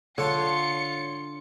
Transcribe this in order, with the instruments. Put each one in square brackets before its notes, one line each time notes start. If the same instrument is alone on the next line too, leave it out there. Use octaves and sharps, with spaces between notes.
[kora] D3 [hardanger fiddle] F4 [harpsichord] C#5 A5 [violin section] C#7